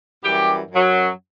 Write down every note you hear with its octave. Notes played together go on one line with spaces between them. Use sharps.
F#2 E3 G3 G4
F#2 F#3